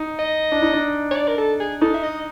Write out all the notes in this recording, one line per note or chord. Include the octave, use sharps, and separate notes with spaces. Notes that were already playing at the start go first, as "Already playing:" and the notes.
Already playing: D#4
D#5
D4
D#4
D4
C#5
D5
A#4
A4
G#4
D#4 A4
E5
D#5